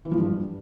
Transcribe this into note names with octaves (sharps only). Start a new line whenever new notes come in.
E3
F3
G2